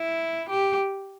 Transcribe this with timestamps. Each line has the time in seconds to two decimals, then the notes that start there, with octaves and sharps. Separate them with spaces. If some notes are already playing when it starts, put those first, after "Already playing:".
Already playing: E4
0.50 G4